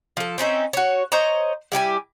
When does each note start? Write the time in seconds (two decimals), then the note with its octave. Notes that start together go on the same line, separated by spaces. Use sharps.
0.17 F3 A4
0.38 C4 C#4 D#4 E5
0.73 F#4 C#5
1.12 C5 C#5 D#5 A#5
1.72 G3 E4 G4 G#5